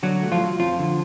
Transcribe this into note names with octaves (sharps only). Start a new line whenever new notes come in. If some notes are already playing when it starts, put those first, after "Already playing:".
D3 F#3 F#4
A3
F3 F4
F#3
F2 F3 F4
D3